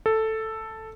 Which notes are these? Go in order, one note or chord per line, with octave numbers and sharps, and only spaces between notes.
A4